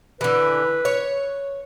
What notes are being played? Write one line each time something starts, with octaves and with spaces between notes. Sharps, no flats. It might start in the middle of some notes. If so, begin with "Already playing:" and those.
D3 E3 B4
C#5